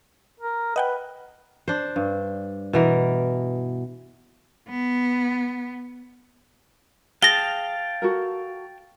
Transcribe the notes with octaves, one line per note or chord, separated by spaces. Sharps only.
A#4
B4 D#5 F#5 G5
D4 C5
G2
B2 E3 A#4
B3
G#4 F5 G5 A5 A#6 G7
F#4 A4 A#4